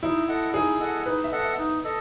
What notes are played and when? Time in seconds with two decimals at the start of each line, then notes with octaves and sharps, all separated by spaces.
0.03 D#4 E4
0.28 A4 D#5 F#5
0.54 D#4 G#4
0.80 A4 D#5 F#5
1.06 D#4 B4
1.24 E5
1.32 A4 D#5 F#5
1.41 E5
1.58 D#4
1.84 A4 D#5